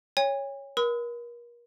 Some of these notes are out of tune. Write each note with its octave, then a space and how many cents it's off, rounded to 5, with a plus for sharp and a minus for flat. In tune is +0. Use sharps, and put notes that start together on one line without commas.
C#5 +0 G#5 -45
A#4 +35 B5 +40 D#6 +40